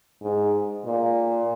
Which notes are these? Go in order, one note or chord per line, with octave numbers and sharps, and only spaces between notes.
G#2
A#2